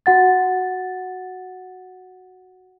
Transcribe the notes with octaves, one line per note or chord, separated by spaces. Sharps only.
F#4 F#5 A6